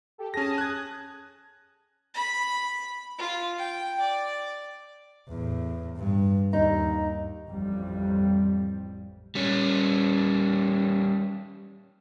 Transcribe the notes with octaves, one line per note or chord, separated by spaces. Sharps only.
G4 A4
C#4 G#4 A5 D#6 A#6
F#6 G#6
B5
F4
G5
D5
E2 A2
G2
D#2 D#4
A1 F2 G3
G3 C#4